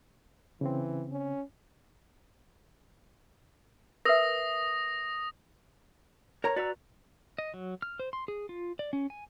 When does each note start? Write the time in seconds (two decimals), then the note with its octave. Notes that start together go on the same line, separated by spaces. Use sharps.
0.61 C#3 E3 C4
1.12 C#4
4.05 A#4 B4 E5 D#6 A#6
6.44 A#4 C#5 A#5
6.56 F#4 B4 D5 A#5 E6
7.38 D#5
7.54 F#3
7.82 F6
7.99 C5
8.13 C6
8.28 G#4
8.49 F4
8.79 D5
8.93 C#4
9.10 G#5